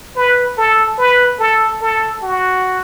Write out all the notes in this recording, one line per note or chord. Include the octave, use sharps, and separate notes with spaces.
B4
A4
B4
A4
A4
F#4